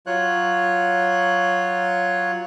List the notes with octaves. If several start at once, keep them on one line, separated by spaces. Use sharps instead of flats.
F#3 F4 C#5 F#6